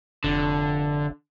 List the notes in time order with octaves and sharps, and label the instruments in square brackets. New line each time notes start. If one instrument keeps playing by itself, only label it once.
[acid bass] F1 [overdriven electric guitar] D3